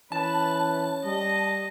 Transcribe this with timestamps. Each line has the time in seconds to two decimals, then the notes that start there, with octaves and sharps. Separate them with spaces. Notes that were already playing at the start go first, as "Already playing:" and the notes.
0.12 E3 C#4 B4 A5
1.05 G3 D#5